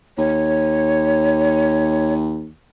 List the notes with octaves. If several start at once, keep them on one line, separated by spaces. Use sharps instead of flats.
D#2 C#5